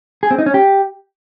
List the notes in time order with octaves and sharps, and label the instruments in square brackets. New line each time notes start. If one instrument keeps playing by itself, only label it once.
[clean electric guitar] G#4
C4
D#4
C#4
G4